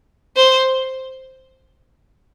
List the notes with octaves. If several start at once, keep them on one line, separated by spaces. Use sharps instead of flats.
C5